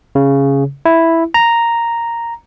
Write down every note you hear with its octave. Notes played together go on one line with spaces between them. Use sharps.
C#3
E4
A#5